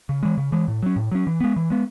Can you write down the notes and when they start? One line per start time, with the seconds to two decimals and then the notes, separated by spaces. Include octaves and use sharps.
0.09 C#3
0.23 E3 G#3
0.38 C#3
0.52 E3 G#3
0.68 A2
0.83 F#3 C#4
0.96 A2
1.11 F#3 C#4
1.27 E3
1.40 G#3 B3
1.56 E3
1.70 G#3 B3